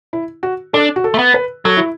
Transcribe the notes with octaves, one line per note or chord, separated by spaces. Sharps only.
E4
F#4
D4 A4
F#4
A4
A3
B3
B4
F#3 A4
E4